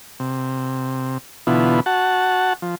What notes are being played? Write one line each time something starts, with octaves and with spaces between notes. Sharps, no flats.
C3
B2 D3 E3 B3 E4 F4
F#4 F#5 A5
F3